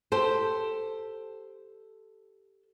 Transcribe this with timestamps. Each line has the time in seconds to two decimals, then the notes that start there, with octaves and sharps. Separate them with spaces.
0.12 G4 A4 C5